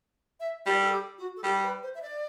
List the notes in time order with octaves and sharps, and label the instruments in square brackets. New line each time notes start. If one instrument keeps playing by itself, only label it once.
[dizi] E5
[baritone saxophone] G3 [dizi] D5
[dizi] A4
G4
F#4
A4
[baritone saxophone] G3 [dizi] G4
[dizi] B4
C5
E5
D5